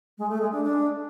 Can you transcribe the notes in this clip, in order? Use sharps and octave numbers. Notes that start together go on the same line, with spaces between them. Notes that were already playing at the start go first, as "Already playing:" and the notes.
G#3
A3
G#3
D4
D4